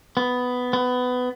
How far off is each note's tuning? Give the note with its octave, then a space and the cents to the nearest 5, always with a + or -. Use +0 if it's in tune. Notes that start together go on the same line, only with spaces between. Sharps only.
B3 +10
B3 +20